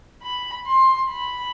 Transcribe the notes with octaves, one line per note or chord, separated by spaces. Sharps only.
B5
C6
B5